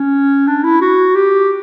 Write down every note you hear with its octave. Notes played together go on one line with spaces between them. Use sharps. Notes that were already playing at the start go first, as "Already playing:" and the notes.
Already playing: C#4
D4
E4
F#4
G4